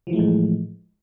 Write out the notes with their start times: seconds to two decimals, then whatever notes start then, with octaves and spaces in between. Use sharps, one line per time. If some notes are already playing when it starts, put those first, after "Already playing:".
0.07 F3
0.10 E3
0.13 A3
0.16 G#3
0.19 A2